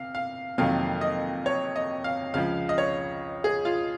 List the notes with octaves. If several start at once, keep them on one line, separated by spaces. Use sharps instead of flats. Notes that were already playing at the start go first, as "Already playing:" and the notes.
Already playing: C3 F5
F5
F2 C3 D#3 F#3 A#3 F5
D#5
C#5
D#5
F5
C#2 C#3 F3 F5
D#5
C#5
G#4
F4